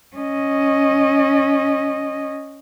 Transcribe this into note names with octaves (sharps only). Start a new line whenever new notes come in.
C#4 D#5